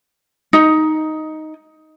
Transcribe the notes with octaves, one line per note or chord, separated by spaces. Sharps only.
D#4